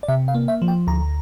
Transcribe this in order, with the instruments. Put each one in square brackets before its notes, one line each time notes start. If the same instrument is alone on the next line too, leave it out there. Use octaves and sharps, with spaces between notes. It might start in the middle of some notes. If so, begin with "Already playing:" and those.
[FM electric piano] D5
C3 E5
F5
A#3
E5
F3
G5
D2 A#5